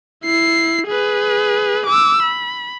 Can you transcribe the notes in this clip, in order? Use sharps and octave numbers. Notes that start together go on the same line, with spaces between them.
E4 C7
G#4 B4
D6 E6
B5